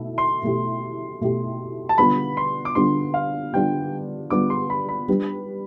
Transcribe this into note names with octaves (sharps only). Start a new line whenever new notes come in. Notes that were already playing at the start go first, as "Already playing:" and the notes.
Already playing: B2 A3 E4
C6
B2 A3 E4 G4
B2 A3 E4 G4
A5
D3 G3 B3 D4 F4 B5
C6
D6
D3 G3 B3 D4 F4 C6
F5
D3 G3 B3 D4 F4 G5
D3 G3 B3 D4 F4 D6
C6
B5
B5
G3 D4 G4 B4